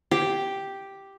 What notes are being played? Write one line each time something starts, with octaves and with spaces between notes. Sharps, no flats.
G4